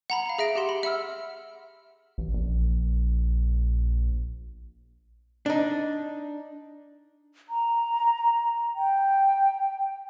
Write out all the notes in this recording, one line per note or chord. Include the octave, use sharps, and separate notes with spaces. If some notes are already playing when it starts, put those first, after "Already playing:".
F#5 A#5 B5
F5 A#5
G#4 E5 A#6 D7
G4 G#4 F#5 C6 E7
B5
E5 F#5 E6 F6
A1
A#1
D4 D#4
A#5
G5